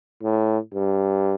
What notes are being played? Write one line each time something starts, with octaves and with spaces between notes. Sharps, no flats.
A2
G2